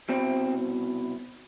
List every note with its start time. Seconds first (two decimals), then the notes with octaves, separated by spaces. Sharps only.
0.09 C2 B2 C4